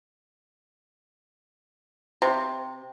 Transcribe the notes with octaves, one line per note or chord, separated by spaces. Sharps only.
C3